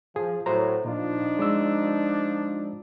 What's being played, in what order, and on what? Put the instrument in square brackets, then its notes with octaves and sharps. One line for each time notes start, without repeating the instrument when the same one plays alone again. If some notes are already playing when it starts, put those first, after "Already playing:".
[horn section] F3 [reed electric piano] G#4
[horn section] A2 F#3 [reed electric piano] C5 A#5
[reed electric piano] A#2 F4 [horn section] F3 D4 D#4
[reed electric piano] G#3 D5 E6